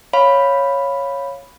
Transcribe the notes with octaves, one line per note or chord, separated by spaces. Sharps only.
C#5 F5 B5